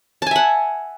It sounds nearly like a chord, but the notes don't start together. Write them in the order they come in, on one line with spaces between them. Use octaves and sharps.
A5 G#5 E5 F#5